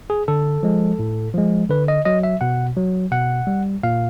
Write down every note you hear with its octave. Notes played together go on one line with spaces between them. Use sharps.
G#4
D3 A4
F3 G#3
A2
F3 G#3
D3 B4
D#5
F#3 D#5
E5
B2 F#5
F#3
B2 F#5
G3
A#2 F5